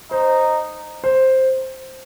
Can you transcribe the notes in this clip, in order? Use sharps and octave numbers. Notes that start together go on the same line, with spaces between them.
D#4 C5
C5